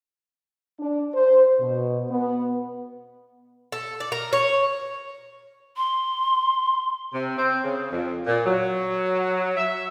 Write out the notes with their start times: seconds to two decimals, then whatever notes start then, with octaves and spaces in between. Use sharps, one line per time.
0.79 D4
1.14 C5
1.59 B2
2.10 B3
3.72 A4
4.00 D5
4.12 A#4
4.33 C#5
5.77 C6
7.14 C3
7.37 C4
7.64 C#3
7.91 F2
8.27 A#2
8.45 F#3
9.57 E5